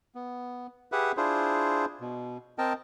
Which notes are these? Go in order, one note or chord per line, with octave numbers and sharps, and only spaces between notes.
B3
G4 G#4 B4 E5 F#5
D4 E4 F4 G#4 C5
B2
C4 A#4 D#5 G5 A5